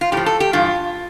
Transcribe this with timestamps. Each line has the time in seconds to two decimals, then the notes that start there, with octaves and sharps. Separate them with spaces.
0.01 F4
0.12 A2 F3 G4
0.26 A4
0.40 G4
0.53 G2 E3 F4